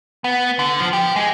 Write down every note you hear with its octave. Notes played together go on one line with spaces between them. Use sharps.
B3
D3
F3
G4
G#3